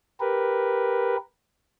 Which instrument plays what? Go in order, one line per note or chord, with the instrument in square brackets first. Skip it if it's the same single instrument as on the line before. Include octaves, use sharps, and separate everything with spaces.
[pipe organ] G4 A#4 B4